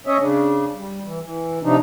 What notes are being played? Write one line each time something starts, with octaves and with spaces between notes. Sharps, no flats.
C#4 C#5 D#5 E5
C#3 D4
G3
E3
E3
C3 F3 D4 D#4